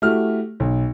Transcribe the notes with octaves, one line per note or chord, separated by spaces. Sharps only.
A3 E4 F#4 G4 F6
B1